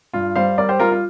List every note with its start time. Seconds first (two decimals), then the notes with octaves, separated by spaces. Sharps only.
0.13 G2 F4
0.35 G3 C5 F5
0.58 G3 A#4 D5
0.69 G4 C5
0.80 G3 F4 A#4
0.92 F4